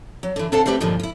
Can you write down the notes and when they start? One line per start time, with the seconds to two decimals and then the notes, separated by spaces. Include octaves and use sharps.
0.23 F#3
0.36 D3 E3
0.52 C3 D4 A4 F5 F#5 A5
0.66 G3 A3 C4 G4 B4
0.80 G2 A#2 D3 D#3 F3
1.00 E4 F4